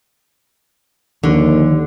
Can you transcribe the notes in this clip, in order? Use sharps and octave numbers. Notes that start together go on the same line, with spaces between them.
D#2 D3 D#3 F3